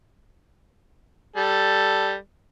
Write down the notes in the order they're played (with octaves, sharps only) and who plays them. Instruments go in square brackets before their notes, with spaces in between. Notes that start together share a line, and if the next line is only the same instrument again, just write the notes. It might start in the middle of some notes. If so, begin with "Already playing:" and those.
[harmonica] G3 A4